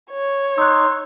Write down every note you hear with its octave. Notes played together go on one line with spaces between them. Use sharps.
C#5
D#4 C6 E6 F#6